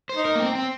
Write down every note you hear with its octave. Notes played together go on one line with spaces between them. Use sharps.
C5
D#4
A#4
A#3
C4
C4